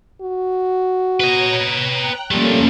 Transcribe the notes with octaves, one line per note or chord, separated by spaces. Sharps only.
F#4
B4 C#5 D#5 A#5
G5 A#5 F#6
F3 G3 A3 A#3 C#4 A4